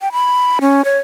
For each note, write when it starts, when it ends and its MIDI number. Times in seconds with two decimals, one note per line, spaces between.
0.01 0.12 79
0.12 0.59 83
0.61 0.85 61
0.85 0.98 73